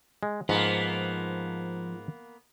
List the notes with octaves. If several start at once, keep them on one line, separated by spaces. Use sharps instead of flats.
G#3
G#2 F3 A#3 B3